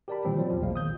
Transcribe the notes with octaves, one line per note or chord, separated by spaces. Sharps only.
G4 A#4 D5 G5 A5 B5
A#2 D#3 E3 G3 C4
F3 F#3 C5 D5
E2 F3
A#1 A#2 G#3 F5
D#3 D#6 G6